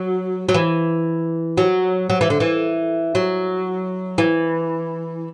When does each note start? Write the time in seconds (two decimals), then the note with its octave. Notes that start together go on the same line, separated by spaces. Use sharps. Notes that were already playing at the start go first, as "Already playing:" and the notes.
Already playing: F#3
0.49 F#3
0.54 E3
1.58 F#3
2.10 F#3
2.21 E3
2.30 D3
2.40 E3
3.15 F#3
4.18 E3